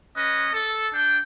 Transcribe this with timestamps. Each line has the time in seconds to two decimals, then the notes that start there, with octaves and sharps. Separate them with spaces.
0.16 C#4 B4 D#5
0.53 A4
0.94 D4 G5